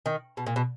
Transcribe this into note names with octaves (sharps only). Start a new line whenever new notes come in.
D#3
B2
A#2
B2